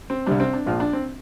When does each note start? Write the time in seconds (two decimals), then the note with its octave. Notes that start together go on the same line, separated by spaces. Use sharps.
0.10 C4
0.26 C2 C3 G3 D4
0.40 C4
0.53 D4
0.66 A#1 A#2 F3 F4
0.80 D4
0.93 C4